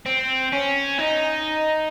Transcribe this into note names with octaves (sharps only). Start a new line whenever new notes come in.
C4
C#4
D#4